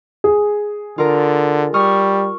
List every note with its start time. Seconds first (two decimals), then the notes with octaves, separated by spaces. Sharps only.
0.24 G#4
0.98 D3 F4 A#4
1.74 G3 C#6 D#6 F6